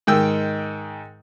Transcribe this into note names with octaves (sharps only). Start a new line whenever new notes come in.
G#2 D#3 G5 E6